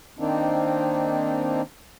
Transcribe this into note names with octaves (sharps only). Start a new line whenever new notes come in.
D#3 A#3 C4 D4 D#4